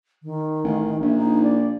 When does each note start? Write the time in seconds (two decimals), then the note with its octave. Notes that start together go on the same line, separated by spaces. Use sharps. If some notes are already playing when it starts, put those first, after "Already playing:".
0.23 D#3
0.63 A1
1.01 A#1 E5
1.15 D#4
1.43 D5